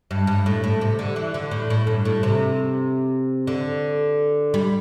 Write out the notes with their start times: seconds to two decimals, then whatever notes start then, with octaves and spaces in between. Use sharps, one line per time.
0.11 G2
0.27 G2
0.46 A2
0.64 A2
0.81 C3
0.99 D3
1.16 E3
1.34 D3
1.51 A2
1.70 A2
1.87 G2
2.05 A2
2.23 C3
3.47 D3
4.54 G3